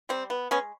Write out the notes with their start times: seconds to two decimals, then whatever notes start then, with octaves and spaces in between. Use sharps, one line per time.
0.09 G3 C4
0.30 B3
0.51 G#3 B3 C#4